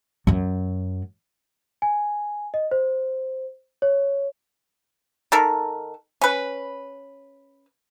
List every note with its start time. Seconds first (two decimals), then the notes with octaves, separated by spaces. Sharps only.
0.27 F#2 F#3
1.82 G#5
2.54 D#5
2.71 C5
3.82 C#5
5.32 D#3 A4 A#4
6.21 C#4 B4